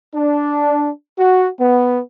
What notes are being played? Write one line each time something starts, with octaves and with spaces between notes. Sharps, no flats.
D4
F#4
B3